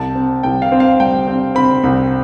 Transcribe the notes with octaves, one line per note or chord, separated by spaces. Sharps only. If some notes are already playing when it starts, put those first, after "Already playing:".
Already playing: C2 A5
C4
C2 G5
F5
C4
F5
G3 G5
C4
C4 B5
C2